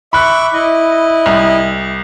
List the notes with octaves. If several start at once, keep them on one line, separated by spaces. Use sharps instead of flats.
E5 B5 C#6 D6 F#6
E4 D#5
C2